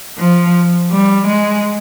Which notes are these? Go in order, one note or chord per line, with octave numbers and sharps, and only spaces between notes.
F3
G3
G#3